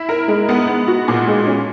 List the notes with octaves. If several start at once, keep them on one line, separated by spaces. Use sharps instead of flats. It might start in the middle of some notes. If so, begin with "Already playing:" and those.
Already playing: E4
A#4
G#3
B3
B3
F#4
A#2
G#3
C#4